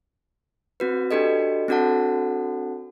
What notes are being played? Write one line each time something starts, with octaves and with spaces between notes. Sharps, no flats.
C4 F#4 B4
D4 F#4 G4 A4 D#5
C4 D4 F#4 A4 F#5 A5